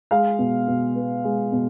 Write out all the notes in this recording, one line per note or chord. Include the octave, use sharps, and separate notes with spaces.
G#3 F5
B2
B2
B3
G#3
B2